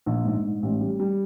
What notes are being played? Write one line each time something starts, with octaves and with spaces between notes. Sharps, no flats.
A#1
G#2
G#2
A1
G3
G3